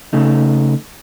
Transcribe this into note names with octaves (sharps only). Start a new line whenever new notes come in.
C#3 A3 D#4